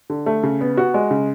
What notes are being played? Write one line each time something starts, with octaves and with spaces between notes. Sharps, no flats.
D3
A3
C#3
B3
F#4
G#3
C#3